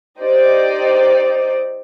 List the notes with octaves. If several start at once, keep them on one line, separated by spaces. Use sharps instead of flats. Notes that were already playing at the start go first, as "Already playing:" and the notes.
D#4 G4 C5 D5 D#5